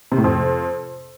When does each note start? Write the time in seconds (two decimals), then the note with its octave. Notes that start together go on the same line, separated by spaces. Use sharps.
0.12 C3
0.18 A2
0.24 F2